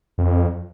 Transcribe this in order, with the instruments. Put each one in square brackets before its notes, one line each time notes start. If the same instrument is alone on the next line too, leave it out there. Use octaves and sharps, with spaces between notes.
[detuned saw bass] F2